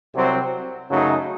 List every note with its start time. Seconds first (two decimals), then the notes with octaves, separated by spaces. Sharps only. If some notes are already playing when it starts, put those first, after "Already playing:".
0.15 C2 C3 F#3 C4
0.90 F#2 C#3 F#3 A3 D#4